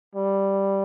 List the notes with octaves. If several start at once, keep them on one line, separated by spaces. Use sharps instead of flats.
G3